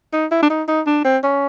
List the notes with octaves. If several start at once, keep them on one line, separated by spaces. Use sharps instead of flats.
D#4
E4
D4
D#4
D#4
D4
C4
C#4